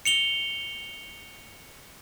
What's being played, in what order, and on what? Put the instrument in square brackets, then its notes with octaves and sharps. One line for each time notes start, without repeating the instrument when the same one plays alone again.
[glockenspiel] C#7 F7 G7